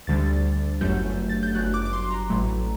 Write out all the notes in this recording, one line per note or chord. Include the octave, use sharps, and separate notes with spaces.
D2 D3 G3 A6
G1 F#2 F#3 A3 G6
A6
G6
G1 F#2 F#3 F#6
D6
D6
C6
A#5
A1 A2 F#3 A3